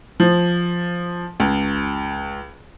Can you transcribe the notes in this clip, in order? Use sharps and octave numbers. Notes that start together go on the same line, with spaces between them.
F3
C#2